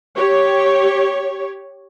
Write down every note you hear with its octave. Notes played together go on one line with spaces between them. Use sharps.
G4 C#5